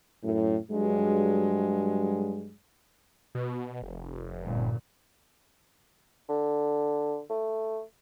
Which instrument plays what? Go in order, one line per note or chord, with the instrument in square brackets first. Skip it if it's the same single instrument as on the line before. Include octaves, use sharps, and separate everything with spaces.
[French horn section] F#2 A2
G2 F#3 G#3
[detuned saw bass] B2
F1
[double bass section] G1 A#2
[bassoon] D3
A3